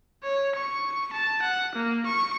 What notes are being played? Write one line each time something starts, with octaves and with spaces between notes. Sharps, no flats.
C#5
C#6
A5
F#5
A#3
C#6